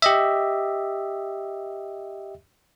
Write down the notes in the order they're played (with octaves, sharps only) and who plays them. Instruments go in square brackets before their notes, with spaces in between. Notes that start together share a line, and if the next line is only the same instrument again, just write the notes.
[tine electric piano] G4 D#5 E5